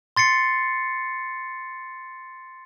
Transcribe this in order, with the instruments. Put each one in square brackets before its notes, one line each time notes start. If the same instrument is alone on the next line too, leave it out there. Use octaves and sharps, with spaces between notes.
[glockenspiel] C6 A6 C7 C#7